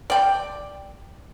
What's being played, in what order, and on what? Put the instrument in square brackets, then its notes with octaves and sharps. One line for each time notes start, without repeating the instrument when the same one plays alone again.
[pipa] D5 G5